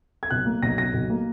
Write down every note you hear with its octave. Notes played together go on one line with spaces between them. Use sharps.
G#6
B1 F#6
A#3
B1 A#6
B1 A#6
B1
A#3